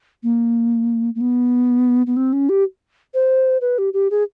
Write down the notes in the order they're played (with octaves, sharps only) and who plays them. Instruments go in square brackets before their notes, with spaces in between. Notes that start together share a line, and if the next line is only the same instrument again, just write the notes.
[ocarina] A#3
A#3
B3
B3
C4
C#4
G4
C5
B4
G4
G4
G#4